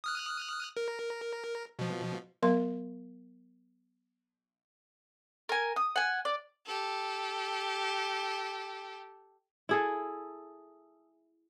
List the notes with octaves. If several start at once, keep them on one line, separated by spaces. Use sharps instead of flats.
D#6 F6 F#6
A#4
B2 F3
F#3 B3 A#4 F5 C6
A#4 G#5
D#6
F#5 G#5
D5
G4 A4
E4 G#4 A4